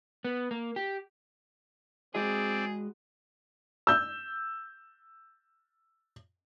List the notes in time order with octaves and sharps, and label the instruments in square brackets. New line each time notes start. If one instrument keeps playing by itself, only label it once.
[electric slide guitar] B3
A#3
G4
[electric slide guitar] G#3 F#4 D#5 [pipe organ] C4 D5 [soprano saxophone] G#4
[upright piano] E6 G6